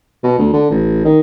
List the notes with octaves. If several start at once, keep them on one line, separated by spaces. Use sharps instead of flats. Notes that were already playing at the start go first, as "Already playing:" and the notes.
B2
D2
D3
A1
D#3